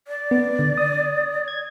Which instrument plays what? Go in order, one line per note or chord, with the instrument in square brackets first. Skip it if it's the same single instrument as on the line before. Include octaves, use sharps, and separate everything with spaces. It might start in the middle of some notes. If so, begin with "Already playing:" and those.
[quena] D5
[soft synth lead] B3
D3
D#6
G#6